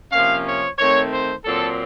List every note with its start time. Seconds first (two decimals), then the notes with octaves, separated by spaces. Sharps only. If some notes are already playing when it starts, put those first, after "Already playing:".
0.12 C3 F3 A#3 C#4 F5
0.45 C#5
0.78 D#3 A3 C4 C#5
1.11 C5
1.44 A#2 F#3 C4 A4